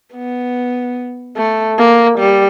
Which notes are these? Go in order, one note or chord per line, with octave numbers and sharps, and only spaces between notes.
B3
A3
A#3
G3